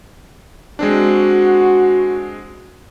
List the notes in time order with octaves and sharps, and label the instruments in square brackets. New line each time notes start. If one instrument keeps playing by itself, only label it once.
[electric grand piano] G#3 C4 D4 [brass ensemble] F#4